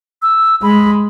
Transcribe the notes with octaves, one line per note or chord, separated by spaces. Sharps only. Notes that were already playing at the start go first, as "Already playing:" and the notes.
E6
G#3 B5